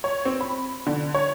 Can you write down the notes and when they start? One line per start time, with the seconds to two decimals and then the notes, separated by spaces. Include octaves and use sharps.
0.04 C#5
0.25 C4
0.41 B5
0.87 D3
1.15 C#5